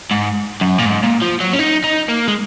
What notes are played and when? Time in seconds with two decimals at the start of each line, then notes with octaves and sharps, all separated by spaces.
0.11 G#2
0.61 F#2
0.78 A#2
0.86 G#2
1.03 A#2
1.21 F3
1.40 F#3
1.53 C#4
1.59 D#4
1.84 D#4
2.09 A#3
2.28 G#3